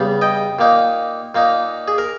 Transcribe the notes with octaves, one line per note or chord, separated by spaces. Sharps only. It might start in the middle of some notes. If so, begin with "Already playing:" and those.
Already playing: E2 C#3 G3 B3
D#5 G5
A#2 A#3 D#4
A#2 A#3 D#4
G#4
A#4